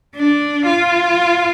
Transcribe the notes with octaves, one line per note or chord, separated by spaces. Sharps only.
D4
F4